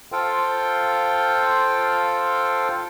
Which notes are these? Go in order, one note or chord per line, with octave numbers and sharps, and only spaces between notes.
F4 A4 C5 F5 G5